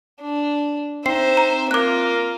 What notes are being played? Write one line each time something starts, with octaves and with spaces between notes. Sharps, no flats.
D4
C4 D#4 C5 E5 C7
A#5
A#3 F4 A#4 D6 F#6